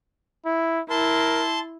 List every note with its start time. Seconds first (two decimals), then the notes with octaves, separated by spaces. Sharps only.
0.46 E4
0.90 E4 A#4 A5 C6